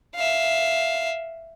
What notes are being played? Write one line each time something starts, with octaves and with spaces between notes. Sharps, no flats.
E5 F5